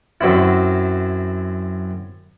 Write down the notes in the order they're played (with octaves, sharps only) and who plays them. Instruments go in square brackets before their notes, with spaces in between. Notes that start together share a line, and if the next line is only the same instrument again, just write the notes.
[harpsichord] F#2 F#3 C4 E4